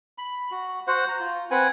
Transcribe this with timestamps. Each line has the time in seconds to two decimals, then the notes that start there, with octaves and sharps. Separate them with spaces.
0.18 B5
0.51 F#4
0.87 F#4 C5 F#5
1.09 A#5
1.20 F4
1.51 C4 B4 F#5 G#5